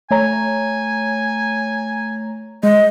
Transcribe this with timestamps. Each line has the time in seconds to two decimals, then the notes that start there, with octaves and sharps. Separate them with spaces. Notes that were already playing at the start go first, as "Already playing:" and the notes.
0.11 A3 C#5 G#5 A#5
2.63 G#3 D#5